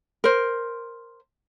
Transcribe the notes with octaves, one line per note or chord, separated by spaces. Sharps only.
A#4 C5